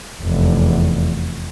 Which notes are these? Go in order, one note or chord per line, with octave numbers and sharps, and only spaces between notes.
F1 E2